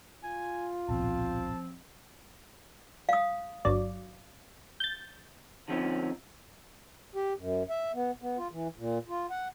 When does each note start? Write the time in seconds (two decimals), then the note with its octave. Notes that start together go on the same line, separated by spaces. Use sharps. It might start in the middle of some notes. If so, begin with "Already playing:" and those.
0.24 F4 G#5
0.89 D1 A#1 B2 F3 C4 A5
3.09 F5 D#6
3.65 G1 F#3 D5
4.80 G6 A6
5.68 D3 F3 G3 C4 C#4 D#4
7.15 G4
7.37 F#2
7.70 E5
7.94 B3
8.22 B3
8.38 F4
8.51 E3
8.77 A#2
9.09 F4
9.30 F#5